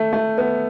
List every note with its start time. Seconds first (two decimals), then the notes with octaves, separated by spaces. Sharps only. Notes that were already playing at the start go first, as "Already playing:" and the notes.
Already playing: A3
0.13 A3
0.38 B3